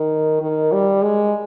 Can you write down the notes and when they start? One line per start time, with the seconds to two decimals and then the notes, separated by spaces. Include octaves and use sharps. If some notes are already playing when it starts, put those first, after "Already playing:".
Already playing: D#3
0.42 D#3
0.72 G3
1.02 G#3